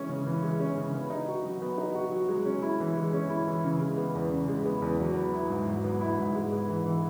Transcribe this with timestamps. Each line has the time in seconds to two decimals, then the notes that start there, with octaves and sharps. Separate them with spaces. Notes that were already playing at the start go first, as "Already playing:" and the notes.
Already playing: E3 G#3 C#4
0.09 C#3
0.26 E3
0.43 G#3
0.60 C#4
0.77 C#3
0.94 B3
1.10 D#4
1.28 F#4
1.45 F#3
1.62 B3
1.78 D#4
1.95 F#4
2.12 F#3
2.28 G#3
2.45 C#4
2.62 E4
2.80 E3
2.97 G#3
3.13 C#4
3.30 E4
3.47 E3
3.64 C#3
3.80 G#3
3.98 B3
4.15 E2
4.31 C#3
4.48 G#3
4.66 B3
4.82 E2
5.00 F#3
5.16 B3
5.33 E4
5.50 G#2
5.67 F#3
5.84 B3
6.01 E4
6.18 G#2
6.35 G#3
6.52 B3
6.69 E3
6.86 E3